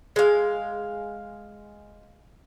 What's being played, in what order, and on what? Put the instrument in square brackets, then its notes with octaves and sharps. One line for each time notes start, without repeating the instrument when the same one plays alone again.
[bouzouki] G#3 F5